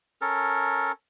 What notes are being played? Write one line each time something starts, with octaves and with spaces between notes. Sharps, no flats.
C#4 A4 A#4